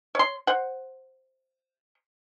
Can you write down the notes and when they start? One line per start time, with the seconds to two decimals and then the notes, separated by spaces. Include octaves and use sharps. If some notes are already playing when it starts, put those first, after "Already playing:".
0.15 C#5 C6
0.47 C5 F#5